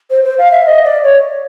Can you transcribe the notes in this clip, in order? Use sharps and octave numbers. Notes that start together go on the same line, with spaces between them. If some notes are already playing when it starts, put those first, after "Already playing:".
C5
C5
F5
E5
D#5
D5
C#5